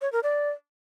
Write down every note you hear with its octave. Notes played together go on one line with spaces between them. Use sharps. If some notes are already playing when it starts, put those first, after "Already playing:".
C#5
A#4
D5